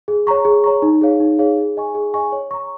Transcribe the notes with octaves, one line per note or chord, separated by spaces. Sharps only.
G#4
C#5 A#5 C#6
G#4
C#5 A#5 C#6
D#4
G#4 C#5 F5
D#4
G#4 C#5 F5
G#4
D#5 G#5 C#6
G#4
D#5 G#5 C#6
C#5
A#5 C#6